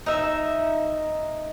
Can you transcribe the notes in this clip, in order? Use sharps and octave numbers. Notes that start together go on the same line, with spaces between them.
D#4 E5